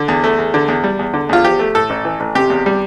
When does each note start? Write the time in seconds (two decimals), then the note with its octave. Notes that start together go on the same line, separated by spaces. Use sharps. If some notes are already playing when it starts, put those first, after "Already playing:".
Already playing: D3
0.08 E2
0.24 A3
0.38 E2
0.54 D3
0.68 E2
0.84 G3
0.99 E2
1.14 D3
1.29 E2 F4
1.44 F3 G4
1.59 A3
1.75 A2 A4
1.90 A1
2.05 E3
2.20 A1
2.35 C3 G4
2.50 E2
2.66 G3